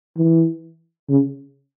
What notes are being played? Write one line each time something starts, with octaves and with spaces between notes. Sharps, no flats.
E3
C#3